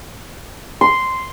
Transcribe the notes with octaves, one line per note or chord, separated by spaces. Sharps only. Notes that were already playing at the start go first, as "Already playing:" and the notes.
C6